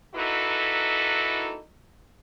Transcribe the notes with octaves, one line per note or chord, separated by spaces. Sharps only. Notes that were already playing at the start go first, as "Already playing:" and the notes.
A#3 D#4 E4 F#4 A4 B4